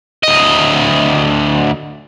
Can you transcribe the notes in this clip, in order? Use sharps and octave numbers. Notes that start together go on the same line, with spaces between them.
D2 D#5